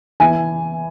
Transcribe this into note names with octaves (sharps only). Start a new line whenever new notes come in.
E3 G#5